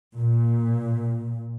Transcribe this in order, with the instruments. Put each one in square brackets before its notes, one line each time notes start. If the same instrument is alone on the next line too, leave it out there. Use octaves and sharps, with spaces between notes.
[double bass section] A#2